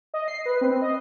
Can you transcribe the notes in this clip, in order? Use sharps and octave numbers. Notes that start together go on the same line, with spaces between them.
D#5
C7
B4
C4
D#5